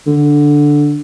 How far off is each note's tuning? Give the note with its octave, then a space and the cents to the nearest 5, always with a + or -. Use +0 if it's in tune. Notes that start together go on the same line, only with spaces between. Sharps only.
D3 +0